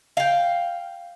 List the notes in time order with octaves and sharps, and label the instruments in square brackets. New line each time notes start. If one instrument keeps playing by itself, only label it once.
[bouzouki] F5 G5